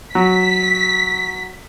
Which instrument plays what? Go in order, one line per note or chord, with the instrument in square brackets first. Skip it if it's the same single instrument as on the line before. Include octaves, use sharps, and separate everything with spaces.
[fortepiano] F#3 [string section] B6